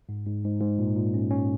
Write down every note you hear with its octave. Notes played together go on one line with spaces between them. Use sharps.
G#2
G#2
G#2
G#2
A#2
A#2
C#4
C#4